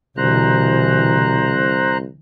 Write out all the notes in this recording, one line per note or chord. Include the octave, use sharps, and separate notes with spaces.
C2 B2 D3 E3 C5 A#5 F#6